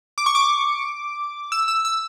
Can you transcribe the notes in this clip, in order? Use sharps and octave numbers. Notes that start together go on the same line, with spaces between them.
D6
C#6
D6
E6
E6
E6